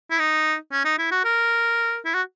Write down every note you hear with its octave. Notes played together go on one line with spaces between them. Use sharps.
E4
D#4
C#4
D#4
E4
F#4
A#4
E4
F#4